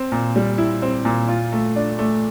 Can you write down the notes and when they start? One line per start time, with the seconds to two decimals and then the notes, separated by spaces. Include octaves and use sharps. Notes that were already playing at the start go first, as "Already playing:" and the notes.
Already playing: C4
0.12 A#2
0.36 G3
0.58 E4
0.82 C4
1.05 A#2
1.29 F4
1.53 A3
1.76 D4
1.99 A3